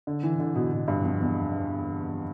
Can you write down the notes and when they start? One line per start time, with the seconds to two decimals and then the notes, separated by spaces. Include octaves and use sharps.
0.07 D3
0.23 E3
0.40 D3
0.56 B2
0.72 B2
0.88 G2
1.04 F2
1.20 E2